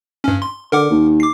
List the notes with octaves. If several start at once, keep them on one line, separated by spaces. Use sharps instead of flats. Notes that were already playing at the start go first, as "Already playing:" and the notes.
G2 C#4
C6
D3 A#4 F#5 D6
D#2
D6 C7